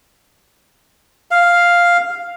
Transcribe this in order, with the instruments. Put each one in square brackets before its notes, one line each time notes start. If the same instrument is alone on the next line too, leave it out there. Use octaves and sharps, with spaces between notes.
[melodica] F5